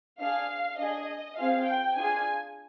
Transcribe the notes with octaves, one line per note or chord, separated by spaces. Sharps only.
D4 G#4 F5
D4 G#4 D#5
C4 F4 G#4 F5
G5
D4 F4 G#4 G#5